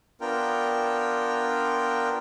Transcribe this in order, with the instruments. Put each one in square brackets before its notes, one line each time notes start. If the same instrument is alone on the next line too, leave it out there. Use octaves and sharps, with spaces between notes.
[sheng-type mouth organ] B3 D4 F4 A#4 G5